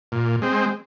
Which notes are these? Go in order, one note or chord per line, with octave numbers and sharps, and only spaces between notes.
A#2
G#3 C4